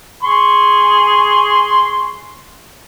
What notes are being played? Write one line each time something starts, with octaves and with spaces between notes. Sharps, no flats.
G#4 C6 C#6